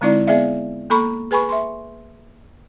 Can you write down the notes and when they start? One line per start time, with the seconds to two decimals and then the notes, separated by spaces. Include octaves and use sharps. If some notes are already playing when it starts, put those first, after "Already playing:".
0.01 D3 G#3 C4 D#4 E4 D5
0.27 B3 G#4 D5 E5 F5
0.90 A#3 A4 A#5 B5 C#6
1.31 G#4 B4 G#5 B5 C#6
1.49 E5 C6